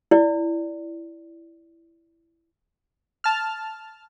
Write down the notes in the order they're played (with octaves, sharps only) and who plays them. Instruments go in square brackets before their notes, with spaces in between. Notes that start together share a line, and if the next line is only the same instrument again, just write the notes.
[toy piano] E4 D5
[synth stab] A5 F6